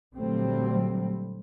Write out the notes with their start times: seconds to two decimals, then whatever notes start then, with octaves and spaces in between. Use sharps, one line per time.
0.15 A#2 D3 F#3 G3 A3 C4